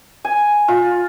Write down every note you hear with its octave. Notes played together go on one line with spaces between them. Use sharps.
G#5
F4